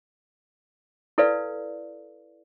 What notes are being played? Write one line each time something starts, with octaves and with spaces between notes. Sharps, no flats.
E4 A4 B4 D5 F5